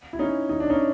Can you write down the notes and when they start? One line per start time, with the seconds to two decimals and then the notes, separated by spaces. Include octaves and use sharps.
0.13 E4
0.19 C#4 D#4
0.49 D#4
0.60 D4
0.70 C#4 D#4